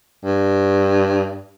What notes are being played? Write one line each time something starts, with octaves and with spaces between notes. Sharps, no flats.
G2